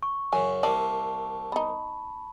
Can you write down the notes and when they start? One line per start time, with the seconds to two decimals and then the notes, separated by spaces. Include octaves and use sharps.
0.03 C#6
0.33 F#2 C#3 G#5
0.63 C2 C3 A#3 D5 A5
1.52 B3 D#4 B5